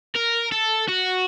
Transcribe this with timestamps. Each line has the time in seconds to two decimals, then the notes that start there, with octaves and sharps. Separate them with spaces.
0.16 A#4
0.52 A4
0.88 F#4